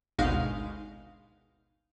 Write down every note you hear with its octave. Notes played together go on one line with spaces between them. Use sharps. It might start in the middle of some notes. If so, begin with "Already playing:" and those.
G#1 D2 B2 G#3 D#4 F5